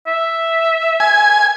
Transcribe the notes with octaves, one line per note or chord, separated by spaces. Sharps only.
E5
G#5